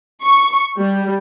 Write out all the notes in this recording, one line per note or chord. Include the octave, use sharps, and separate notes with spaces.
C#6
G3